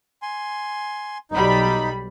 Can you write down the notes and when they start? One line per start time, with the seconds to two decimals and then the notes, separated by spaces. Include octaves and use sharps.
0.22 G#5 C6
1.31 B1 G3 D#4 B5